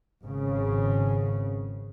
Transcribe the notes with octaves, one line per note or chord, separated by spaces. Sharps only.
G#1 C#3